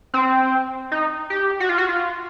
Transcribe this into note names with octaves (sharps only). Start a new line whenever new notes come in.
C4
D#4
G4
F#4
F4
F#4
F4